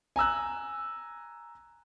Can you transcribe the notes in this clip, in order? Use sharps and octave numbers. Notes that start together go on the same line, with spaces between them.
G#5 A#5 E6 F#6